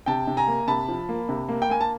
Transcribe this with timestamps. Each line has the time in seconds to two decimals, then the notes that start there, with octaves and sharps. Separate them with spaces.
0.06 C3 G5 A5
0.27 C3
0.37 G#5 A#5
0.47 A#3
0.67 C3 A5 B5
0.88 F3
1.09 A#3
1.29 C3
1.49 A#3
1.62 G5
1.69 A#3 G#5
1.81 A5